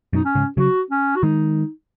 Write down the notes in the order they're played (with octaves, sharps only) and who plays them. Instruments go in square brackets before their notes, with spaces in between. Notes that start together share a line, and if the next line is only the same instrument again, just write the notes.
[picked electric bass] F#2 B2 [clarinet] D#4
[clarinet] C#4
[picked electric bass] G#2 C#3
[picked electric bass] C#3 F#3 [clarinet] F#4
[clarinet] C#4
F#4
[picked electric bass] D#3 G#3 [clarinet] D#4